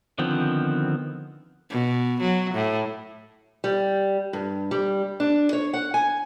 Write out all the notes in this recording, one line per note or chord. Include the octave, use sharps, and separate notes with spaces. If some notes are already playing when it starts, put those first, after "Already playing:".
D3 D#3 F3 B3 C4
B2
F#3
A2
G3
G2
G3
D4
C#5
F#5
G#5